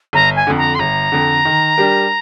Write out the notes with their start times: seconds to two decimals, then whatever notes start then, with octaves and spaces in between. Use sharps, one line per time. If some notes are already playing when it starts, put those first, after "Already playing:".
0.13 G1 A#5
0.35 G#5
0.47 F2 D3
0.57 A#5
0.74 C6
0.79 G1 A#5
1.12 F2 D3
1.45 D#3
1.78 G3 D4 G4 A#4